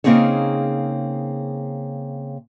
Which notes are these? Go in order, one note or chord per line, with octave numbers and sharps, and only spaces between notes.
C#3 A#3 C4 D#4 G#4 C#5